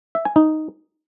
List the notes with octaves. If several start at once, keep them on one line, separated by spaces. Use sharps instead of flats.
E5
G#5
D#4